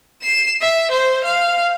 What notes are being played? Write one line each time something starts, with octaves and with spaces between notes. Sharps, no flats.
C7 E7
E5
C5
F5